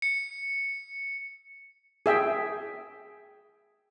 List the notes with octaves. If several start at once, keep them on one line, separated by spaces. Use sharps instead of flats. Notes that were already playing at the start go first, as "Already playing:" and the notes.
C#7
G#4 E5 G5